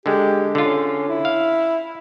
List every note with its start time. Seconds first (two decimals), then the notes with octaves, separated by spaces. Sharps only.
0.06 D3 G#3 G4
0.55 D3 C#4 F4
1.09 E4
1.25 F5